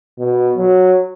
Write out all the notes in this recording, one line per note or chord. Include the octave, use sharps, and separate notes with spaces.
B2
F#3